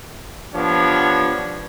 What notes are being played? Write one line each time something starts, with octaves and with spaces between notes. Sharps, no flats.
F3 B3 D4 G4 C#5